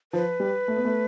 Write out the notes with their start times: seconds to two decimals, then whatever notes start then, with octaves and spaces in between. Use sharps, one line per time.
0.13 F3 B4
0.40 G3
0.68 A3
0.76 B3
0.85 A3